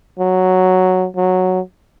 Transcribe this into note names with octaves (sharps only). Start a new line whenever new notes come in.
F#3
F#3